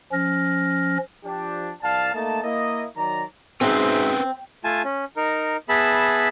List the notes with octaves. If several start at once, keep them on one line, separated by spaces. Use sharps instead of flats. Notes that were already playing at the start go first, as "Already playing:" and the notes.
F3 C#4 F6 A#6
F3 D4 G4
C2 D5 F5 A5
A3 A#3 D#4 A5
A#3 E4 D#5
D#3 F#3 D5 A#5
G#2 B2 C4 C#4 G#4 B4 C5 E5
A3 F4 G#5 A5
C#4
D#4 A#4
B3 G#4 E5 A5 B5